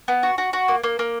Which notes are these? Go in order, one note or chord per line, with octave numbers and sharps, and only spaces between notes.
B3
F#4
F#4
F#4
A#3
A#3
A#3